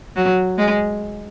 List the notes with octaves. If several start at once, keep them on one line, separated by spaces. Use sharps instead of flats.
F#3
G#3